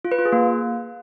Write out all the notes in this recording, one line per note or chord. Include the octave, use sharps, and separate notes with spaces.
F4
B4
F4
G#4
A#3